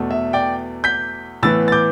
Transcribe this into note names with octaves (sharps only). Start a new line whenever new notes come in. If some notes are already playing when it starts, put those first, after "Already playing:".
Already playing: E2 B2 A3
E5
D5 G5
G6 B6
A2 E3 B3 E6 A6
A6
D6 G6